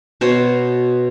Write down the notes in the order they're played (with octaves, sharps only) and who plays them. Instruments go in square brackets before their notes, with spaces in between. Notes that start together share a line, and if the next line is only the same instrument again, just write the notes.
[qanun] B2 C5 C#5